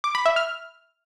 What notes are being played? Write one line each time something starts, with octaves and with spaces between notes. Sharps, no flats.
D6
B5
E5
F6